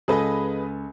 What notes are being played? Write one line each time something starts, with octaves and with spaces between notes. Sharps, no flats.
C#2 G#4 A4 B4 D#5 G#5